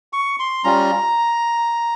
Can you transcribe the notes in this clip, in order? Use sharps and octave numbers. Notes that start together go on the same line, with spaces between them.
C#6
C6
G3 C#4 F4 A#5